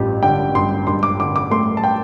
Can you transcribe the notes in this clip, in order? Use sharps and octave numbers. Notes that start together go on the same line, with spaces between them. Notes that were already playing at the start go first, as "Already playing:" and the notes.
Already playing: A1 G2 F4 G4
D3 G5
G2 C6
G2 C6
D6
D3 D6
D6
A3 C6
A5
G5